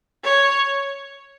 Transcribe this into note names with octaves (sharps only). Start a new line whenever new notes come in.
C#5